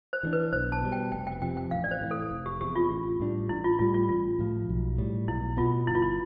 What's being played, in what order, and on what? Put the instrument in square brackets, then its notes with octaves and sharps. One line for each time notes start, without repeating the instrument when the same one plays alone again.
[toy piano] C5
[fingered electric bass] E3 G3 D4
[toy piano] B4
[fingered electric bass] B1 [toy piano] C5
[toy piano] A5
[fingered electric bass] B2 G3
[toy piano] G5
[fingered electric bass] F1 [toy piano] G5
[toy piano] G5
[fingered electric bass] F2 C3 F3 [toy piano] G5
[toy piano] G5
[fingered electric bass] A1 [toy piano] F5
[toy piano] D5
C5
[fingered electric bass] A2 E3
[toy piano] A4
[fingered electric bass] F1
[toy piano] G4
[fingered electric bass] E2 C3 [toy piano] G4
[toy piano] F4
[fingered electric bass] A1
A2 G3 D4
[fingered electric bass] A1 [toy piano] E4
[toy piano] F4
[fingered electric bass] A2 G3 [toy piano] F4
[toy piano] F4
[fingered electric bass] A1 [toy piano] F4
[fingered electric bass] A2 F3
B1
A2 G3
[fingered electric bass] B1 [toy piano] E4
[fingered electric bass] B2 B3 [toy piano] F4
[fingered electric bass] G1 [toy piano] E4
[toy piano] F4
E4